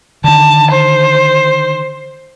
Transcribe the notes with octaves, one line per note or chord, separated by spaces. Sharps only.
D3 D#3 A5
C5